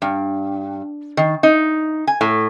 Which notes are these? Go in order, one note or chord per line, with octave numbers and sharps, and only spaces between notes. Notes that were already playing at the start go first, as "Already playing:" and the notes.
G2
D#3
D#4
G#5
A2